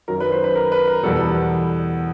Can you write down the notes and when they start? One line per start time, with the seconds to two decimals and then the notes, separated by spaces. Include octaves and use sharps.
0.08 F#2 D#3 F#3 A#4
0.20 B4
0.32 C5
0.44 B4
0.56 A#4
0.72 B4
0.87 A#4
1.03 E2 B2 G3 A4